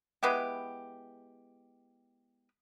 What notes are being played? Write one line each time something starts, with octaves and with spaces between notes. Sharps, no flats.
G#3 B3 E4 G4